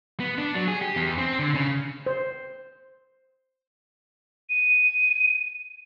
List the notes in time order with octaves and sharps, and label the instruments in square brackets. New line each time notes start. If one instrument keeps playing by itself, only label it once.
[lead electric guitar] B3
D4
F#3
G#4
G4
E2
C4
D3
C#3
[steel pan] C5
[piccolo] D#7